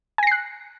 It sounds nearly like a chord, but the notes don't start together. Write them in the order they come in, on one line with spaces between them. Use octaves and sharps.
G#5 A#6 C7 F#6